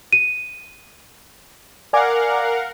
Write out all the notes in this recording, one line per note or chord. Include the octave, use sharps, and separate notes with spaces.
D#7
A#4 D5 F5 F#5 G#5 D6